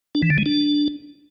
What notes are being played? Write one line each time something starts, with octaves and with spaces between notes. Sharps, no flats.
D4
E3
D3
G#3
D4